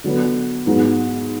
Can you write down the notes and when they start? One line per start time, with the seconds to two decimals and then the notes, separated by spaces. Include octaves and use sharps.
0.04 D3 F#3 B3
0.66 G#2 F#3 B3